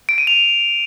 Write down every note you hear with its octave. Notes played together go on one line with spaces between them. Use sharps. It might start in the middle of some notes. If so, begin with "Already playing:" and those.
D7
D#7
F7